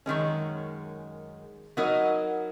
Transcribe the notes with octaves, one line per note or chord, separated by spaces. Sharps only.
F#2 D#3 G#3 C#4
F#3 B3 D#4 A#4 D#5